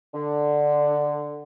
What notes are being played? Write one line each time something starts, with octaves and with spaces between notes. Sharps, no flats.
D3